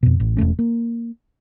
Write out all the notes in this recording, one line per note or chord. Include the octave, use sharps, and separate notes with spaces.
F2 B2
A1
E1 G#2 A3 C#4
A#3